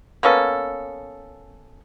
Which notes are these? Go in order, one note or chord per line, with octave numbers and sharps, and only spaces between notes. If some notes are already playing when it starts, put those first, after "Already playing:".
A#3 B3 C#4 A4